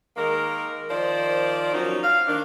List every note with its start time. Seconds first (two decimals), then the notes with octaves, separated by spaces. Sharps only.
0.16 D#3 G#3 A#3 A#4
0.89 D#3 F3 C5 D5
1.73 F3 F#3 A#3 C#4 D#4
2.03 F5
2.27 D#3 A#3 D4